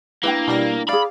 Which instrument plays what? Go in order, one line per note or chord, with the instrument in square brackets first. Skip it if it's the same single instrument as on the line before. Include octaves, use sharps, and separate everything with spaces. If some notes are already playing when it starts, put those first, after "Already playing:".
[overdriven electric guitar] A#3 [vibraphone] D4 E4 [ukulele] B4 F5 G5
[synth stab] B2 G3 A#6
[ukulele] G#4 D5 [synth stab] F5 [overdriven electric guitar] B5